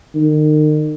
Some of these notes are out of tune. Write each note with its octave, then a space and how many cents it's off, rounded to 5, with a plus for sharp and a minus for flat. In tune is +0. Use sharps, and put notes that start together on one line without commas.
D#3 -35